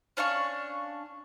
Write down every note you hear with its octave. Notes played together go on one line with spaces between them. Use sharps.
C#4 D4 F5 C#6